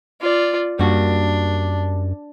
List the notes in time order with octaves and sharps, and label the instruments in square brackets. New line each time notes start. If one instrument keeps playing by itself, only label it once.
[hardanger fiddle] F4 D5
[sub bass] F#2 [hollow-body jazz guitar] G3 A#3 F#4 [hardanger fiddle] D4